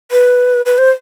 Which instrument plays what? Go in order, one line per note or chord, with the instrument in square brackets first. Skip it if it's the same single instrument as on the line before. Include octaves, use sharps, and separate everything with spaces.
[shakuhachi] B4
B4
C5